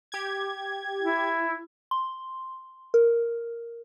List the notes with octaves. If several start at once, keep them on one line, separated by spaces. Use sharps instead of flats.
G4 G#6
E4
C6
A#4